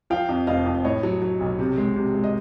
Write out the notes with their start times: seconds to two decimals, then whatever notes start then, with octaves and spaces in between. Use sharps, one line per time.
0.10 F3 F5 G5
0.29 F2
0.47 F1 D#5 F5
0.66 F2
0.85 A2 C#5 D#5
1.03 F#3
1.22 F#3
1.41 B1
1.59 C3
1.77 G#3
1.96 C3
2.15 G#3
2.24 D#5